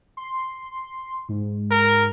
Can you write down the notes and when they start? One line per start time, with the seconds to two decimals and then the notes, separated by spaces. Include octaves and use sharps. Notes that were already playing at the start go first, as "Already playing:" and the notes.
0.17 C6
1.29 G#2
1.71 A#4